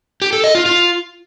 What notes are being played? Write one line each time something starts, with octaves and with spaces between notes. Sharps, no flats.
G4
A4
D#5
F4
F4